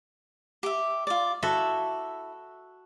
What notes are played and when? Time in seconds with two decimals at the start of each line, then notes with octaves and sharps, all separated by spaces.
0.63 G4 E5
1.07 F4 D5
1.43 E4 F#4 A4 E5